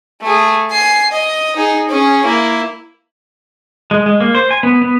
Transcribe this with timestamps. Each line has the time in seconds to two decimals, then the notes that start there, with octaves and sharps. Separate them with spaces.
0.22 A3 G#4
0.71 G#5 C7
1.12 D#5
1.56 D#4 G#4
1.89 C#4 G#4
2.26 A#3 E4
3.91 G#3
4.06 G#3
4.21 A#3
4.35 C5
4.51 G#5
4.63 B3
4.82 B3